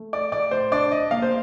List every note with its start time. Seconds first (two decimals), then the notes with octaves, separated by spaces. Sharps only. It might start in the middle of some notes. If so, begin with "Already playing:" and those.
Already playing: A3
0.13 D5
0.32 A2 D5
0.51 C5
0.71 D4 D5
0.92 D#5
1.11 A#3 F5
1.22 C5